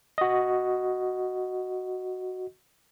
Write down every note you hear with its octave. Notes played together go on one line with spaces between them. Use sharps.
F#4 D#5